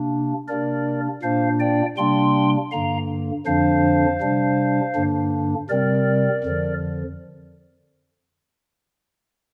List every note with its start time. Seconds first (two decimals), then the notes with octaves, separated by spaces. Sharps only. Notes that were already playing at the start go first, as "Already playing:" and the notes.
Already playing: C3 A#3 D4
0.48 C3 A#3 D4 A#4 D5
1.22 A#2 A#3 D4 C5 F5
1.60 D5 G5
1.97 C3 G3 A#3 D4 G5 C6
2.71 G2 D3 A#3 F5 A#5
3.46 F2 D3 F3 D4 C5 F5
4.20 C3 G3 D4
4.95 G2 D3 A#3 D4
5.69 C3 G3 C4 A#4 D5
6.44 F2 D3 F3